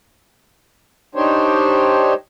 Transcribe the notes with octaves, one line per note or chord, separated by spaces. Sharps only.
D4 D#4 G4 C5 C#5